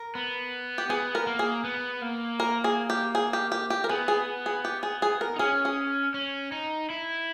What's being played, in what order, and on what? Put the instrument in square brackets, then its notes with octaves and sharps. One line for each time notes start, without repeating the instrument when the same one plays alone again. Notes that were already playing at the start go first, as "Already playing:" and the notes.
Already playing: [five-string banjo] A#4
[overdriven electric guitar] B3
[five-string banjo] G4
[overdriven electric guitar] B3 [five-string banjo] G#4
[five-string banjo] A#4
[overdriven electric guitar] A#3
[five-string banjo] G#4
[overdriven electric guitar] B3
A#3
[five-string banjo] A#4
G#4
G4
G#4
G4
G4
G4
A#4
[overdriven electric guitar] B3 [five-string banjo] G#4
[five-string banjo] G#4
G#4
G4
G#4
G#4
A#4
[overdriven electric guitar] D#4
[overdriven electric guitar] C#4 [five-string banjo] G#4
[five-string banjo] G#4
[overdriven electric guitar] C#4
D#4
E4